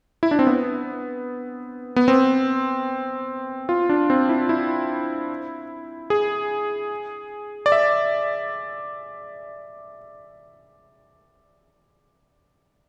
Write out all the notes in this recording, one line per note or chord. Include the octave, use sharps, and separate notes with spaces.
E4
D4
C4
B3
B3
C4
F4
D4
C4
E4
E4
G#4
D5
E5